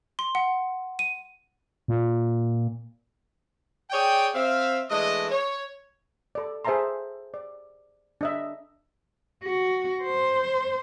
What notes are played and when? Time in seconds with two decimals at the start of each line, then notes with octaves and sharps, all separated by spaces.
0.19 C6
0.35 F#5
0.99 D#7
1.88 A#2
3.91 G#4 C#5 D5 G5
4.35 C4 E5 F5
4.90 E3 G#3 A3 D4 D#5
5.31 C#5
6.35 A4 D5
6.65 G#4 C5 E5 A5 A#5 C6
7.34 D5
8.21 D4 D#5 E5
9.44 F#4
10.02 C5